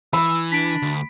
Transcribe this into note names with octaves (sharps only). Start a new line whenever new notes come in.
E3 B5 E6
D4 B6 D7
D2